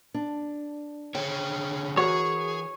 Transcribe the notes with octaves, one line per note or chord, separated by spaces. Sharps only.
D4
D3 G#4 C#5 G5
E3 F#4 G#4 A#4 C#5